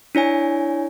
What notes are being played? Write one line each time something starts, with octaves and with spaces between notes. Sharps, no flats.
D4 E4 C#5 G#5